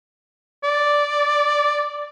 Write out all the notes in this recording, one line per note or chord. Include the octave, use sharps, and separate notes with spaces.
D5